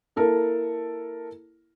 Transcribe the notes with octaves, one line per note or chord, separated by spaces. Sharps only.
A#3 E4 A4 A#4